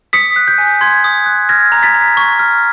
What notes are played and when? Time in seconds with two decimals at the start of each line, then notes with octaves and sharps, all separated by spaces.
0.13 D#6 B6 C#7
0.36 F#6
0.48 G6
0.58 G#5
0.81 C6 G#6
1.04 D#6
1.26 F#6
1.49 F6 G#6 A#6
1.72 A#5
1.83 A6 B6
1.94 A#5
2.17 C#6
2.39 F6